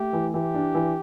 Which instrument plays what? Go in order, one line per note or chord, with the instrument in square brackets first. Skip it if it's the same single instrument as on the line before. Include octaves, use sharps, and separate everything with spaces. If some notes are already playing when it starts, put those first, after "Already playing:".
Already playing: [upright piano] A3 [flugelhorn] G4
[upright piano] E3
[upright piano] E3 [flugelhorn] G4
[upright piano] D4
E3